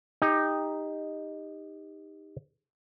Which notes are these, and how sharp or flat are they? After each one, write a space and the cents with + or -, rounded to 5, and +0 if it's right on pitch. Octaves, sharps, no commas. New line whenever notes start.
D#4 +0 G4 +25